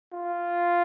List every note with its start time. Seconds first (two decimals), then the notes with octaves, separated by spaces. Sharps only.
0.13 F4